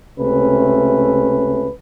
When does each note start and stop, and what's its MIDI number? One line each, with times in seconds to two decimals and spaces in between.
0.19 1.70 37
0.19 1.70 48
0.19 1.70 57
0.19 1.70 61
0.19 1.70 71